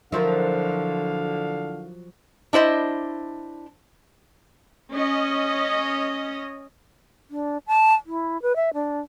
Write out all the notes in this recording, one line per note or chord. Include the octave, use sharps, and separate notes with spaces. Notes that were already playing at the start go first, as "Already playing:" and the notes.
D3 F3 F#3 E4 F#4 A#4 F5
D4 E4 C5 D#5
C#4 D#5
D4
A5
E4
B4
E5
D4